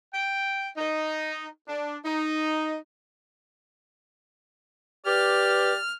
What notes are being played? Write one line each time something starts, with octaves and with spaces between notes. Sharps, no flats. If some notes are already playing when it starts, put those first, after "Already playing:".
G5
D#4
D4
D#4
G4 B4 D5 F6